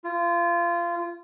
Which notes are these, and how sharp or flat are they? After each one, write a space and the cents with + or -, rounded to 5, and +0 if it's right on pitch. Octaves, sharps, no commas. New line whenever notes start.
F4 -25